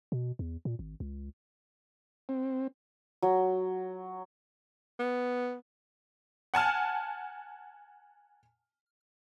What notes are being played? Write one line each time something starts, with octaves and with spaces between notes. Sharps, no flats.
B2
E2
A#2
G#1
C#2
C4
F#3
B3
F#5 G#5 A5 F6